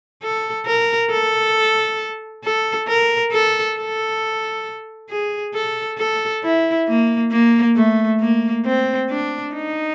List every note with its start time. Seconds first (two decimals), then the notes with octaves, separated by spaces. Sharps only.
0.22 A4
0.66 A#4
1.10 A4
2.44 A4
2.88 A#4
3.32 A4
3.78 A4
5.10 G#4
5.54 A4
5.98 A4
6.44 E4
6.88 A#3
7.31 A#3
7.76 A3
8.20 A#3
8.65 C4
9.10 D4
9.54 D#4